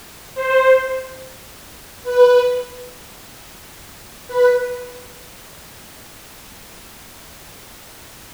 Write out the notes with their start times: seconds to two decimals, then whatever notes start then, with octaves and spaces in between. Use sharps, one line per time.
0.35 C5
2.03 B4
4.28 B4